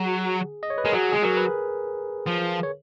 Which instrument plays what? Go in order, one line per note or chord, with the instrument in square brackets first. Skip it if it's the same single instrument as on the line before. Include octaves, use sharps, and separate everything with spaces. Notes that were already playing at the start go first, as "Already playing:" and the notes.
Already playing: [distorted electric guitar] F#3 [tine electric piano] G#4
[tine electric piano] D#5
C#5
B4
[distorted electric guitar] G#3 [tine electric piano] A#4
[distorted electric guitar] F#3 [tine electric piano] G#4
[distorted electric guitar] G#3 [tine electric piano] G#4
[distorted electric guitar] F#3 [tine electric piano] A#4
[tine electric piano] B4
[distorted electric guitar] F3
[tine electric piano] C#5